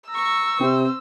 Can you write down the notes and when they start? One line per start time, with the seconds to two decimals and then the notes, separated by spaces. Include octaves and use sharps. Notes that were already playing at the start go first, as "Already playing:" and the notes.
0.10 A#5 C#6 E6
0.60 C3 C4 C5